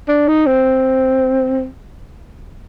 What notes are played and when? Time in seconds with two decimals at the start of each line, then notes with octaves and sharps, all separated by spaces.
0.08 D4
0.28 D#4
0.46 C4